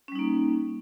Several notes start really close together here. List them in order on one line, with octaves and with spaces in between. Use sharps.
C#4 G3 D#4 A#3